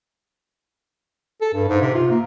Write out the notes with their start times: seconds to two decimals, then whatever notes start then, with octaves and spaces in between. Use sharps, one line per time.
1.41 A4
1.54 G2
1.68 G#2
1.82 C3
1.94 F4
2.11 A#3